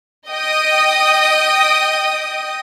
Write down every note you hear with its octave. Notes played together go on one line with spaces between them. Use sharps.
D#5 G5 D#6